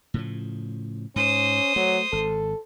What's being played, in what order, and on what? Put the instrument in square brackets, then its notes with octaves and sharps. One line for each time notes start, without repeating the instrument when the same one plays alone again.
[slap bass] A2 C#3 F3
[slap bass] G#2 [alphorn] C#4 [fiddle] C5 D#6
[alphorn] F#3 [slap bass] A3
[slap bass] G#1 [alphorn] A4